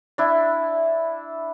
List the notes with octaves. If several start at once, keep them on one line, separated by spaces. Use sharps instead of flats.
D4 E4